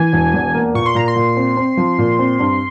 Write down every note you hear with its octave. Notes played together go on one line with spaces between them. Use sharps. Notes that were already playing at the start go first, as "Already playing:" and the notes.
Already playing: E3 G#5
E1
E2
A#3
A#2 C#6
C6
A#2 A#5
C6
A#2
C4
C4
F3
A#2
C4
G2